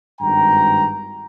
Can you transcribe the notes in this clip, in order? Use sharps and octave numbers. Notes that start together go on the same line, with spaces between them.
G#1 G2 G5 A#5